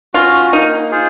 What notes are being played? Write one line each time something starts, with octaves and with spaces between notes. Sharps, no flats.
C#4 F4 F#4
A#3 D#4
F4 G#4 C5